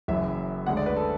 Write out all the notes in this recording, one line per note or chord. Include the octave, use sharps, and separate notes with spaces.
F#1 F#2 E3 E5
D2 D3 G#3 F#5
D5
B4
A4